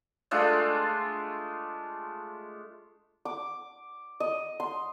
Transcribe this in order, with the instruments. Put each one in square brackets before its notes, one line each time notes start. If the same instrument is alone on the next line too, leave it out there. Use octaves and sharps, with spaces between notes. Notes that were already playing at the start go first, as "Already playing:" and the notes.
[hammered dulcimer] G#3 A3 D4 F4
[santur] D6
D#5
C6